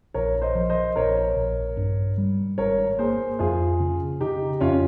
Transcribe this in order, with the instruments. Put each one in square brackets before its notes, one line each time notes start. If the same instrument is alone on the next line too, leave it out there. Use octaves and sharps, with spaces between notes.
[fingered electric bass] A#1 [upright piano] A#4 C#5
[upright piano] C5 D#5
[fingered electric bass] F3
[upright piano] C5 D#5
[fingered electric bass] A#1 [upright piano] A#4 C#5
[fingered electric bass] A#1
G2
G3
[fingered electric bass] G#1 [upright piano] A#4 C#5
[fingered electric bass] A#3 [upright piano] G#4 C5
[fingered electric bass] F2 [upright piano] F4 G#4
[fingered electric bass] C#3
[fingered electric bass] C#3 [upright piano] D#4 G4
[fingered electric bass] F2 [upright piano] C#4 F4